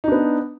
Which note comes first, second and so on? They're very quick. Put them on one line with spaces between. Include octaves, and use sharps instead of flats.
D#4 D4 B3